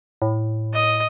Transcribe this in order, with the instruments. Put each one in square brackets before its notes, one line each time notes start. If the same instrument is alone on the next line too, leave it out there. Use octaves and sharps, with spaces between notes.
[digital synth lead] A2
[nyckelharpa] D#5